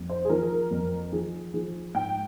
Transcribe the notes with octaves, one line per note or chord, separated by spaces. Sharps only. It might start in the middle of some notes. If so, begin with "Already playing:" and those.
Already playing: F2
C5
G#4
F3 A#4
F2
F3 G#4
F3 G#4
G#2 G5